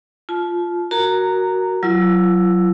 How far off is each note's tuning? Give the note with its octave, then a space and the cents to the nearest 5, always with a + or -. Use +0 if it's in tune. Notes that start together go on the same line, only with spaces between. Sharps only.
F4 +0 A5 -25
F#4 +5 A#4 +0 A#5 -10
F#3 +0 F4 -40 E6 +5